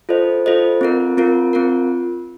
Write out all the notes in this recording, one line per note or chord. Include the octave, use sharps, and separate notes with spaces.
F4 A4 C5 D#5
F4 A4 C5 D#5
C4 F4 A#4
C4 F4 A#4
C4 F4 A#4